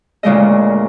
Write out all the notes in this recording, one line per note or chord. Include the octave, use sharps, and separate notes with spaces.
D2 A#2 C#3 G#3 A4 D#5